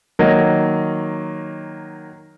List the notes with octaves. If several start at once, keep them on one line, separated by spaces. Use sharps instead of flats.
D#3 F#3 A#3 D#5